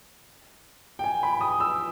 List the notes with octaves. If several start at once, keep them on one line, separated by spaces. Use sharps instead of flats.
G5
G#5
B5
D#6
E6